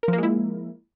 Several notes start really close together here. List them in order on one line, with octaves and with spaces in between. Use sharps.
A#4 F3 A#3 G#3 E4